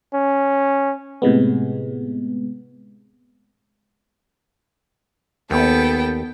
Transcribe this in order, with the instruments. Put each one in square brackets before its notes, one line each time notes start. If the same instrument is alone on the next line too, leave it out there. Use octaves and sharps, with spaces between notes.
[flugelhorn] C#4
[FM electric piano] A2 C3 G#3 B3
[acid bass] D#2 [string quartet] B3 A4 G5